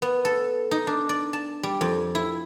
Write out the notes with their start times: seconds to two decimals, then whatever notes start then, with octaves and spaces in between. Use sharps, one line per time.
0.02 B3
0.25 A4
0.71 D#4
0.87 D4
1.09 D5
1.33 A5
1.63 G3
1.81 F2
2.15 E4